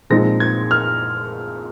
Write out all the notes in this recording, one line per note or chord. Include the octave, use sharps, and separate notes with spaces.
A#2 F3 G#3 C4 D#4 A#6
G#6
F6